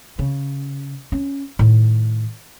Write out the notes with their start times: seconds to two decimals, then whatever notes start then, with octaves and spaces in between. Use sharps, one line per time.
0.19 C#3
1.12 C#4
1.59 A2 D#3